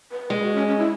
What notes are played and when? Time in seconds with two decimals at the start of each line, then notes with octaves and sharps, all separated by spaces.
0.11 B4
0.30 G#3 B4
0.43 F#4
0.55 C#4
0.68 C#4
0.79 E4